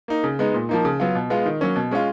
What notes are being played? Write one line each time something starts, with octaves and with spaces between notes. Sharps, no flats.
A#3 D#4
C#3
G#3 B3 D#4
A#2
F3 A#3 D#4
C#3
F#3 B3 F4
B2
G#3 B3 F4
D#3
F#3 A#3 C#4
B2
G#3 C#4 F4